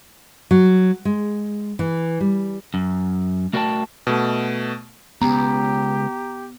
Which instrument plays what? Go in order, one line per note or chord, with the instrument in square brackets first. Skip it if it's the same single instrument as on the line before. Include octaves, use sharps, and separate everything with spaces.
[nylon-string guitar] F#3
G#3
E3
G3
[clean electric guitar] F#2
A3 F#4 A#4 D5 G5 A5
[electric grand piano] B2 A3
[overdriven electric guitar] C#2 [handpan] B3 [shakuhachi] G4 [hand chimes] A#5